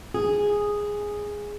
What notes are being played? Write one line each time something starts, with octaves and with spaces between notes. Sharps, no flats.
G#4